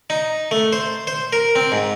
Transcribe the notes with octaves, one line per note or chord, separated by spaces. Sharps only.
D#4
A3
C5
C5
A#4
C4
G#2